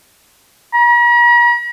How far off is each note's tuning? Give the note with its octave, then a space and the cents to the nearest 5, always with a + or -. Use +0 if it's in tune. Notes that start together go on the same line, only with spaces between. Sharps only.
A#5 +45